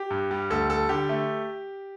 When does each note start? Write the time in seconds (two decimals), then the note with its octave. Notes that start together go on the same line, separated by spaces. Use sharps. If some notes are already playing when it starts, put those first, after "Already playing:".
Already playing: G4
0.10 G2
0.31 G3
0.50 D2 A4
0.70 G3 A4
0.89 D3 G4
1.09 A3